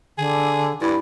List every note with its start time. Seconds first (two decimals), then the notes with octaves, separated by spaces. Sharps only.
0.18 D3 G#4
0.81 G2 E4